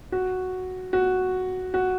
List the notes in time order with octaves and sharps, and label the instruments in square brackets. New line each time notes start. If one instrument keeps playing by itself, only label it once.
[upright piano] F#4
F#4
F#4